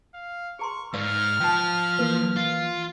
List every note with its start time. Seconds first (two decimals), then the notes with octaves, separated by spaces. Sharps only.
0.15 F5
0.59 G#4 A#5 C6 C#6
0.93 G#2 D5 F5 E6 F6
1.40 F3 G5 A5
1.99 E3 A#3 B4
2.36 F4